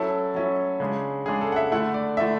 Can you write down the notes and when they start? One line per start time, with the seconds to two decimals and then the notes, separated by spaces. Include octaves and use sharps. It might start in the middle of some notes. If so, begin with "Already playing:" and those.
Already playing: F#3 C#4 E4 A4
0.35 F#3 C#4 E4
0.80 C#3 G#3 D4
1.26 C#3 G#3 D4 G#4
1.41 A4
1.52 F#5
1.56 E5
1.71 D3 A3 E4 F#5
1.94 D5
2.17 D3 A3 E4 E5